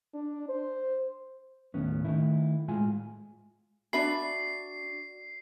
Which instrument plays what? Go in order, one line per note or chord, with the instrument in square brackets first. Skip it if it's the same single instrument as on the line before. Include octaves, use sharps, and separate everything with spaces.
[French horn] D4
C5
[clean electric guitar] D#2 A2 B3 C#4
D#3 A3 E4
A2 G#3 F4 G#5
[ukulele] D4 E5 B5 [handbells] F#4 D5 [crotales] C7